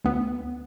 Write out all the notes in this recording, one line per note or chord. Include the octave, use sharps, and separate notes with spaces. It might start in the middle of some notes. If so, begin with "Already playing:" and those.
D2 B3